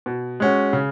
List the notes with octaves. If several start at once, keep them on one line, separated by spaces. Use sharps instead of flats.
B2
G#3 C#4 F#4
C#3